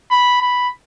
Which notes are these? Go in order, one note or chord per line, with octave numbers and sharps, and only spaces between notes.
B5
B5